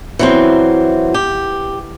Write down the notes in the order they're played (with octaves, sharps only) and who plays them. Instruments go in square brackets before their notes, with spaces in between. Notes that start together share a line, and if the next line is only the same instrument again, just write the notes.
[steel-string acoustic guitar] E3 F#3 C4
G4